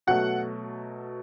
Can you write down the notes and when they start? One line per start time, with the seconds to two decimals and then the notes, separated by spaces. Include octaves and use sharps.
0.07 B2 F#3 A3 F#5